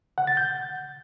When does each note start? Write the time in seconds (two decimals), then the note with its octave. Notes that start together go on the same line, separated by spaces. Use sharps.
0.18 F#5
0.27 A6
0.37 G6